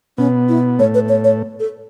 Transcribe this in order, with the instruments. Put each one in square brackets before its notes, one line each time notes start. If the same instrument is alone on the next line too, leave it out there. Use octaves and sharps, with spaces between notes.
[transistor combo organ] B2 B3 [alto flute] C#4
[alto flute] E4
[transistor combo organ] A2 A3 [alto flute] C#5
[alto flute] B4
C#5
C#5
A4